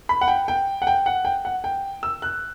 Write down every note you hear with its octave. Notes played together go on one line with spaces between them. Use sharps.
B5
F#5
G5
G5
F#5
G5
F#5
G5
F#5
G5
E6
F#6